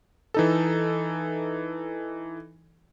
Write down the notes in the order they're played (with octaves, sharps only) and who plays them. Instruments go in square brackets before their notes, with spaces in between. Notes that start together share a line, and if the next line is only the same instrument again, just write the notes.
[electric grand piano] E3 D#4 A4